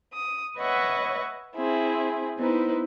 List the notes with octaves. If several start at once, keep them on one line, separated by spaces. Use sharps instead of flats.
D#6
B4 C#5 D#5 E5 F#5 C#6
C4 E4 G#4
B3 D#4 E4 B4 C5